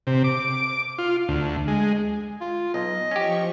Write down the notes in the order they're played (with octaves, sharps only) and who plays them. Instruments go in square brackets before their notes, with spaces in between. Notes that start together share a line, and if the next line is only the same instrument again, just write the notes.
[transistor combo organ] C3
D6
F4
D2
G#3
[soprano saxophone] F4
[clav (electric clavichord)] B1 [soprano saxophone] D#5
[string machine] F3 C#6 [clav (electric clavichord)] C#4 G4